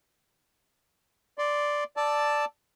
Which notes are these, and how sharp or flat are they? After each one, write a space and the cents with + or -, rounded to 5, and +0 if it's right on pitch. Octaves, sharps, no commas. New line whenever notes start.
D5 +0 C6 -5
D5 +0 A5 +0 E6 +0